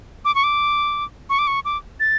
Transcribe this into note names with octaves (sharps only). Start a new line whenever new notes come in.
D6
C#6
D6
C#6
D6
C#6
D6
A6